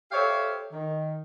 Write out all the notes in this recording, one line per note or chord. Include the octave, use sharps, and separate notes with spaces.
G4 A4 C5 C#5 E5 F5
D#3